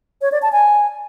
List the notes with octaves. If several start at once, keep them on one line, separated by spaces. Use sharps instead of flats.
C#5
D5
A5
G#5